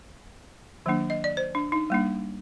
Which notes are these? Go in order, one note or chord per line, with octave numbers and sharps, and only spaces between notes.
D#3 F#3 A#3 D4
D#5
D5
C5
D4
D#4
G3 A#3 D4